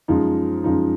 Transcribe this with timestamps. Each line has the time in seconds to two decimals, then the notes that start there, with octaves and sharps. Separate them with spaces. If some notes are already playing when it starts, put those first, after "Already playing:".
0.08 F#2 F3 G#3 D#4
0.64 F#2 F3 G#3 D#4